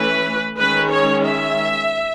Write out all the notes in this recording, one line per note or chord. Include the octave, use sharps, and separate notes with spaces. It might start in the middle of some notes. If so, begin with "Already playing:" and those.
Already playing: E3 A3 C#4 B4
D#3 G#3 C#4 B4
C#5
E5